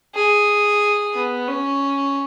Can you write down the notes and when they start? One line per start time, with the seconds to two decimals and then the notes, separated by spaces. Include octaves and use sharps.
0.15 G#4
1.15 B3
1.48 C#4